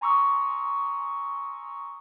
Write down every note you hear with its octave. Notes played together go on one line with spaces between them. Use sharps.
G#5 A#5 C6 C#6 D#6 E6